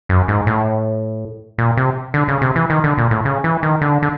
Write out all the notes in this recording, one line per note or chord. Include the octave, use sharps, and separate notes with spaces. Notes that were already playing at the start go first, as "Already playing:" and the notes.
F#2
G#2
A2
A#2
C3
D3
C#3
C3
E3
D#3
D3
A#2
A2
C#3
E3
D#3
D3
D3